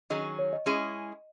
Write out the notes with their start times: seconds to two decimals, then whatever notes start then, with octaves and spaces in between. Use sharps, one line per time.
0.10 D#3 F#3 C#4 G#4 D#5
0.39 C#5
0.53 D#5
0.66 G#3 C#4 E4 G#4